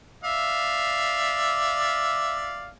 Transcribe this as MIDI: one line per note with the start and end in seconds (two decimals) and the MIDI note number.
0.24 2.71 74
0.24 2.71 76
0.24 2.71 77